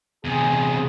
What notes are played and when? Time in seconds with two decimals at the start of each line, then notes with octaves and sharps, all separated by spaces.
0.25 E2 C3 G#4